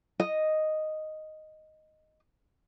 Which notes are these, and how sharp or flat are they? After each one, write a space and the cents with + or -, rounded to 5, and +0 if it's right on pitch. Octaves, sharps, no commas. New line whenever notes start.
D#5 +0